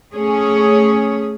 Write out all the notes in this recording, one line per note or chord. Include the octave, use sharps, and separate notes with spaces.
A3 C#4 G#4 C#5